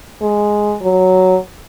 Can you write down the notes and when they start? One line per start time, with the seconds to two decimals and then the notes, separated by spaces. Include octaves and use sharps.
0.21 G#3
0.82 F#3